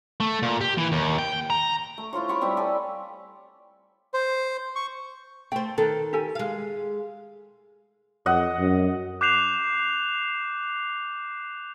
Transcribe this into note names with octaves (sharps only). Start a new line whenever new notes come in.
A3
A#2
G4
E3
D#2
G5
A#5
A3
E4 F4 C5 C#5
B5 C#6 D6
G3 C4 G4 E5
A4 D5 G#5
C5
C#6
A3 C5 G5
D#3 A4 B4
G4 A4 G#5
G#3 F5
F2 D#5 F#5
F#2
D6 F#6 G6 C7 E7 F7